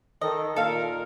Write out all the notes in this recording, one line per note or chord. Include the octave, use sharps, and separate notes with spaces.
D#3 A4 D#5
A#2 D#4 A4 A#4 F5